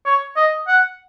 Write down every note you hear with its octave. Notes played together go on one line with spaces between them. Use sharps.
C#5
D#5
F#5